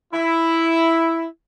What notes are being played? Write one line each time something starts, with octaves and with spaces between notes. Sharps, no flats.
E4